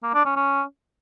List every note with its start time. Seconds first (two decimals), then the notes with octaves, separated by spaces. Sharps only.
0.03 A#3
0.14 D4
0.25 C#4
0.36 C#4